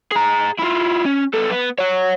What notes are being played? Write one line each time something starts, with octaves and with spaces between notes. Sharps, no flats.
G#4 A#5
E4 F4
C#4
B3 A4
B3
C#5 F#5